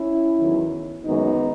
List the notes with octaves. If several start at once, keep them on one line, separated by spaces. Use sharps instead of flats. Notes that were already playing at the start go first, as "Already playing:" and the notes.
Already playing: C#4 E4
E2 D#3 F#3
F#2 D#3 G#3 B3 D#4